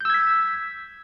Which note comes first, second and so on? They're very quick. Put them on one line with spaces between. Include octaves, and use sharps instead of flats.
G6 E6 G#6 B6